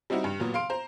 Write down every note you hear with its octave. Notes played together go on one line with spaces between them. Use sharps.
G3 C4 D#4 E4 F#4
G2
A#2 F#3 B3
F5 C6 D7
C5 A#5